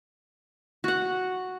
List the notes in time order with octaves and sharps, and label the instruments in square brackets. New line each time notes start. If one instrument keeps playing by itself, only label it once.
[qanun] F#4 F#5